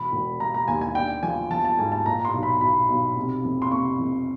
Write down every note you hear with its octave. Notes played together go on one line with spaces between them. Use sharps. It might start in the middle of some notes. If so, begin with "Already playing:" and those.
Already playing: E1 B5
E1
E1 A#5
A#5
D#2 G#5
G#5
D4 G5
F3 G#5
F3 A5
A5
G#2 G#5
A5
A#2 A#5
C6
B1
B5
B1 B5
B1
C3
F2
C6
C3 C#6
F2